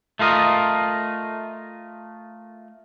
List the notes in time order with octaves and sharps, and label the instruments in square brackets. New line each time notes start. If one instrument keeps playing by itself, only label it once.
[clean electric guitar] A3 F4 A#4 D#5